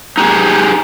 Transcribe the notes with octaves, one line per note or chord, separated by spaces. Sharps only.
D#4 G4 G#4